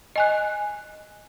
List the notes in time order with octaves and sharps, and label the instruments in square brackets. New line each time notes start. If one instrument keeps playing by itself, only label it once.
[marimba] D#5 G#5 F#6